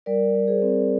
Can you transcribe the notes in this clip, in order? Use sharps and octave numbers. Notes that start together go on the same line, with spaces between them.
G3 A#4 D5
G3
G#4 C5
C4